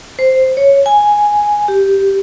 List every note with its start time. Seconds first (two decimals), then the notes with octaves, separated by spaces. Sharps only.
0.19 C5
0.57 C#5
0.86 G#5
1.68 G4